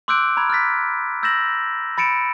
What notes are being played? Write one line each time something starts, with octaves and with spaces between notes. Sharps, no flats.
C6 D6 E6 F#6 G6 D7
A#5 B5 G#6
F6 F#6 A6 B6
E6 G6 A6 A#6 E7 F#7
B5 A6 C#7 D7 E7